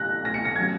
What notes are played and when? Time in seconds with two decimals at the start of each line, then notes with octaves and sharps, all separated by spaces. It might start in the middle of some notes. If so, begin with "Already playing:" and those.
Already playing: F#6 A#6
0.25 A#6
0.34 C#7
0.45 A#6
0.56 F#3 C#4 G#6